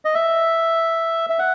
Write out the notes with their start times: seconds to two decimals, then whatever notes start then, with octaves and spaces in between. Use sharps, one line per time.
0.05 D#5
0.15 E5
1.30 E5
1.39 F#5